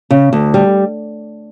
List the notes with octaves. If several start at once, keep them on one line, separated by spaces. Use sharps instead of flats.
C#3
D2
G3